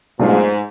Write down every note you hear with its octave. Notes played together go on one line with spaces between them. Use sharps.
G#2 B2 F#3 A3 D4 F4